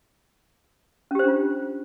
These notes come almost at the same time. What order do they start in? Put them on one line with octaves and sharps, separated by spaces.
C#4 G4 C5 D4 F4